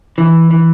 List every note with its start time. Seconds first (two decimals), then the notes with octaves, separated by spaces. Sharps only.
0.18 E3
0.51 E3